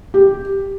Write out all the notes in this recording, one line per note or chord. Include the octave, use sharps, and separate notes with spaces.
G4